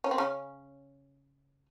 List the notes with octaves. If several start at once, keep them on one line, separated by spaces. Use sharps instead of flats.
C#4
C4
C#3 C#4